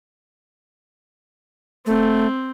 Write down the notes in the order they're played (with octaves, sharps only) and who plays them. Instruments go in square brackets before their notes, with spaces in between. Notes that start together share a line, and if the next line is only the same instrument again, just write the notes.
[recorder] A3 [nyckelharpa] C4